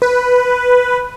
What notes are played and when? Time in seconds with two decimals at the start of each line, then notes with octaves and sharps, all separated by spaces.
0.02 B4